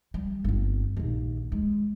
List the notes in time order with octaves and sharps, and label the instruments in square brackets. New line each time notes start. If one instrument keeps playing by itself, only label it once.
[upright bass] G3
G1 C4
A#1 D#2
G#3